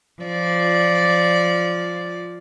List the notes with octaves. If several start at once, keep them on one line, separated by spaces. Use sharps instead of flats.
F3 D5